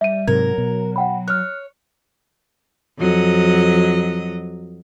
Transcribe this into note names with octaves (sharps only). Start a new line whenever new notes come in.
G3 E5 D#7
G#2 C3 F#3 A#4 G#6
B2
F#5 G5 B5
C#5 F6 F#6
F2 F#3 D#5